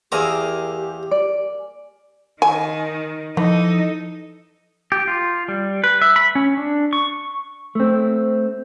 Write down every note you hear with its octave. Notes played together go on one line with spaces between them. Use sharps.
E2 A#3 G4 G#4 A#5 D6 E6
D5
D#3 G#5
E3 F3 D#4 A4
G4
F4
G3
B4
E5
B5
C#4
D4
C#6
A3 C4